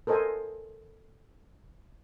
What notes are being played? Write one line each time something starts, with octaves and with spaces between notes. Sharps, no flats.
A4 A#4 C5 D#5 G#5